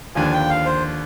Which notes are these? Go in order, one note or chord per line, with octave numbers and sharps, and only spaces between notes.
D#2 D3 F3 G#5
G5
F5
C5